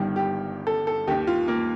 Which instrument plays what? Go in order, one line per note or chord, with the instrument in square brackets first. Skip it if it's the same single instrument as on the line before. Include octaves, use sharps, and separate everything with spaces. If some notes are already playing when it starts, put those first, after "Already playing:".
Already playing: [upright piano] G1 G2 D#3 G4
G4
A4
A4
D#2 D#3 G4
F4
A#3